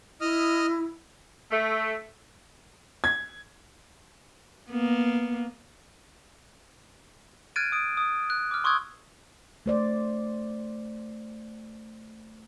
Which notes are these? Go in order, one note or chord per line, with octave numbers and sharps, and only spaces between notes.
E4 D#5 D#6 F6
A3
G#6
A#3 B3
F6 F#6 G#6 A6 D7 D#7
D#6 D7
D#6
F#6
D6 F6
C6 C#6 D#6 E6 F#6 G#6
A3 C5 D5